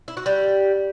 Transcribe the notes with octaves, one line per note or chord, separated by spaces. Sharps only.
E4
F#4
G3